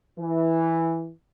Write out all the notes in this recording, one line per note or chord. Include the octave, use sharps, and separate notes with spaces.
E3